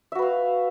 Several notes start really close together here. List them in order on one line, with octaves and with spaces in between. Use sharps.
E5 F#4 B4 F5